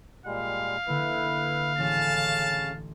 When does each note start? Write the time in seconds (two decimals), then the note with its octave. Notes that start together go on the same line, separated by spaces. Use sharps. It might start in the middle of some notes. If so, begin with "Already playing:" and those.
0.26 A#2 G3 G#3 F5
0.87 D3 A#3 E4 B4
1.79 A1 C#3 C#4 A5